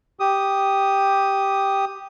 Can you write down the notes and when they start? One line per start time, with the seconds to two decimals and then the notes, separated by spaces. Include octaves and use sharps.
0.20 G4 D#6